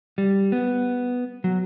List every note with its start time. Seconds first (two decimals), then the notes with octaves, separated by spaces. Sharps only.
0.18 G3
0.52 B3
1.44 F#3